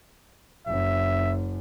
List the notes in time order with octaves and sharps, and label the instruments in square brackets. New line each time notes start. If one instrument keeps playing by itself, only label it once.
[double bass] F#1 F#2 [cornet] E5